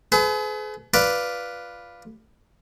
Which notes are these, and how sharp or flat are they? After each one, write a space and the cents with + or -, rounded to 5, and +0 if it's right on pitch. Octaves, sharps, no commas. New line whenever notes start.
G#4 +40 B4 +40
F4 +0 B4 +0 D5 +0